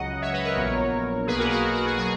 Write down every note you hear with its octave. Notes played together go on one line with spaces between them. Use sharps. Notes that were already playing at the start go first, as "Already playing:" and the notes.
Already playing: C#2 C#3 F#3 D#5 F#5
C#5 E5
B4 D#5
A#4 C#5
A#1 A#2 F#3 B3
B1 B2 A#3 G#4 B4
F#4 A#4
F#4 A#4
F#4
G#4
B2 F#3 G#4